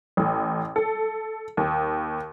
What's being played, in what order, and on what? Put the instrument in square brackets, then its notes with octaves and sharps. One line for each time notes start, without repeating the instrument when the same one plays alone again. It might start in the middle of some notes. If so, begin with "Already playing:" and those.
[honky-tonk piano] A1
A4
D#2